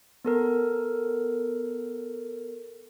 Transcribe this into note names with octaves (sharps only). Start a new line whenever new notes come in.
B3 A4 A#4